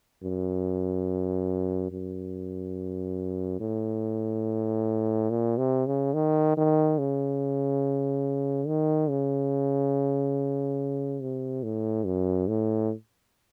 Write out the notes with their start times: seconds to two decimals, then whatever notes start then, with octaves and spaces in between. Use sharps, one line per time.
0.23 F#2
1.91 F#2
3.60 A2
5.30 A#2
5.58 C3
5.86 C#3
6.14 D#3
6.57 D#3
6.98 C#3
8.67 D#3
9.09 C#3
11.21 C3
11.63 A2
12.06 F#2
12.48 A2